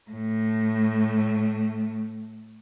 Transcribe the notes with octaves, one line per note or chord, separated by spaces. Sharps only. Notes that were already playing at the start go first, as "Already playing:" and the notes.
A2 A3